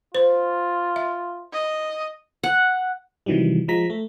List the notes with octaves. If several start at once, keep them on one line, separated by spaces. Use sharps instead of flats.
F4 C5
E5
D#5
F#5
C3 D#3 E3 F#3 G3
F3 G#3 A#5 B6
A3